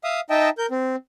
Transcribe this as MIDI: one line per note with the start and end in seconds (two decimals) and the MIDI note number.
0.04 0.20 76
0.04 0.20 77
0.04 0.20 87
0.30 0.50 63
0.30 0.50 75
0.30 0.50 76
0.30 0.50 79
0.30 0.50 81
0.58 0.66 70
0.58 0.66 91
0.71 0.96 60